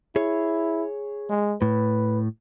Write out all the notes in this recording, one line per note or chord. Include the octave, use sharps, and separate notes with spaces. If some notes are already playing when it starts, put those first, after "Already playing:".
E4 G#4 C#5
G#3
A2 B4